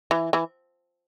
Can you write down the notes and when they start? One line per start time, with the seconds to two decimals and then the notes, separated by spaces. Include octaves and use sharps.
0.11 E3
0.33 E3